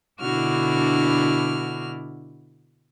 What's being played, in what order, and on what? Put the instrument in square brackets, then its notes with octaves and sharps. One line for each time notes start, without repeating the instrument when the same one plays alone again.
[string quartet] B2 D3 D4 E4 F#4 F6